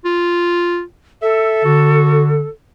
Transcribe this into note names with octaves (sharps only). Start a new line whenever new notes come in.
F4
A4 E5
D3 F#4